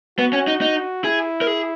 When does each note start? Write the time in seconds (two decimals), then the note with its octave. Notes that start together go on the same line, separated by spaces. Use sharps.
0.19 B3 F#4
0.33 C#4
0.47 D#4
0.61 D#4
1.04 E4 G#4
1.41 A#4
1.47 G#4